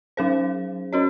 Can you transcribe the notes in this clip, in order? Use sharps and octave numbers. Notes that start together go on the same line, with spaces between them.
F#3 C#4 G#4 C5
C#4 F#4 C#5